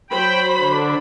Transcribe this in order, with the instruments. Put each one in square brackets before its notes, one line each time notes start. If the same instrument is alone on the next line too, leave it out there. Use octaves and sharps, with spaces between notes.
[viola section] F#3 C5 B5 [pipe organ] G5
[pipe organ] D3 D4